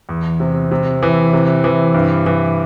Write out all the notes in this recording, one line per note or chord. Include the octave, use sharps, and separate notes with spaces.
E2
C3
C3
E3
C3
E3
G2
E3